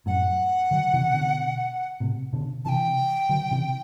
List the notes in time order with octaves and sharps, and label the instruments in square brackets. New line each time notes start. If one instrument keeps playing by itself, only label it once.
[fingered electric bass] F#2 A2 [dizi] F#5
[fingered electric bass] D3 F#3
C3 E3
B2 D3
A2 C3
B2 D3
[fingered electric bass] C3 E3 [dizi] G5 A5
[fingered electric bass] D3 F#3
C3 E3